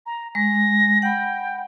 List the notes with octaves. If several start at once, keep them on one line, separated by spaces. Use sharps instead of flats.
A#5
G#3 A#6
F#5 G5 B5